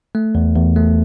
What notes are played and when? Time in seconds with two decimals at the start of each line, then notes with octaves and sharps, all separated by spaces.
0.15 A3
0.35 E2
0.56 E2
0.76 A3